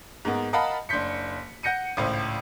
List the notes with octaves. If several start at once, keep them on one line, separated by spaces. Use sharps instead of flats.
G#2 A#3 B3
A#4 D#5 F5 F#5 A5 B5
F#1 D4 C6 G6 B6 C#7
F#5 G6 A#6 C#7 D#7
G#1 C#2 A2 C5